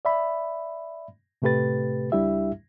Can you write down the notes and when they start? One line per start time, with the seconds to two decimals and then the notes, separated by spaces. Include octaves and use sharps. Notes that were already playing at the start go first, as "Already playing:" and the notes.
0.05 D5 E5 B5
1.42 A2 C3 A3 G4 B4 A6
2.12 C#2 G3 D4 E4 G4 E5